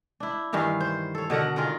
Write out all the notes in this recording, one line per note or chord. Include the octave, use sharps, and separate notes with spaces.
D4 E4
G2 D#3 E3 F5
C5
A4 C#5
B2 D3 A#4 F#5
D#3 F4 G#4 A#4